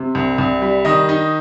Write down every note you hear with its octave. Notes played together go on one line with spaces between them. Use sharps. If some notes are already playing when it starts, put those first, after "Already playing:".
Already playing: C3
C2
C2
G3
D#3 D#5
D#4